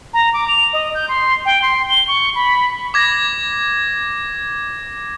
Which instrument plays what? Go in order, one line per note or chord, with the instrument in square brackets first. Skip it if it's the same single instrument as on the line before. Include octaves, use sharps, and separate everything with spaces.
[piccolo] A#5
D6
F7
D#5
G6
C6
G5
C6
G7
C#6
B5
[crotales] D6 G#6 A#6